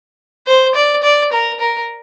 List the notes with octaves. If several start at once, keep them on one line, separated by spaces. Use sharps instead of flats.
C5
D5
D5
A#4
A#4